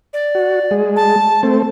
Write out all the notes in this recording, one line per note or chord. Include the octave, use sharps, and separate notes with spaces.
D5
F#4
G#3
A5
A3 C4